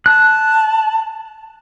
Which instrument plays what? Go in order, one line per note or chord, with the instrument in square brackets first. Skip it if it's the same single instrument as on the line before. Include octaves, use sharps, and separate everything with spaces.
[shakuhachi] A5 [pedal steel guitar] F#6